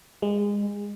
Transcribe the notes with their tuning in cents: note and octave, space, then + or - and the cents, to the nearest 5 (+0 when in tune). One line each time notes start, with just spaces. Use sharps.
G#3 -25